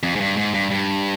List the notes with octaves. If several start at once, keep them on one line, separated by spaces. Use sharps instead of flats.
F2
G#2
G2
G#2
G2
G2